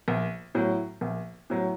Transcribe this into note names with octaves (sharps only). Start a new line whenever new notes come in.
A#1
A2 F#3
A#1
A2 F#3